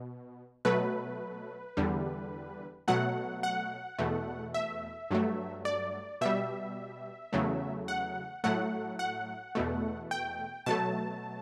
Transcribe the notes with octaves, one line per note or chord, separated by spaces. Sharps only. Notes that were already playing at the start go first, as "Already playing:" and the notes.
Already playing: B2
B2 F#3 A3 B4
E2 D3 G3
B2 F#3 A3 F#5
F#5
E2 B2 A3
E5
G2 F#3 A3
D5
B2 G3 E5
E2 C#3 F#3 A3
F#5
A2 F#3 A3 F#5
F#5
E2 B2 A3
G5
B2 F#3 A3 A5